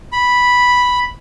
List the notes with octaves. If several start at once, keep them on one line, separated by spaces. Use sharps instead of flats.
B5